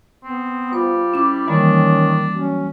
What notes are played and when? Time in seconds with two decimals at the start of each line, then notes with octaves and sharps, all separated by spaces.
0.24 B3 C4
0.73 G3 F4 C5
1.14 C#4 E4 D6
1.48 D#3 E3 G3 A#3 C#4 D4
2.34 F#3 C#4